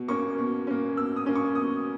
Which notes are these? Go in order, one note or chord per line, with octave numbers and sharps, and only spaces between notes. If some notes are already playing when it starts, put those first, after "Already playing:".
Already playing: B2
A#3 C#4 C#6
B2
A#3 C#4
B2 E6
D#6
A#3 C#4
C#6
B2 D#6